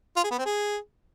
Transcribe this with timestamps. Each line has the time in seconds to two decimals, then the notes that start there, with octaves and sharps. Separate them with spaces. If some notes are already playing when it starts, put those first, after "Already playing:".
0.16 F4
0.24 G#4
0.31 B3
0.38 C4
0.45 G#4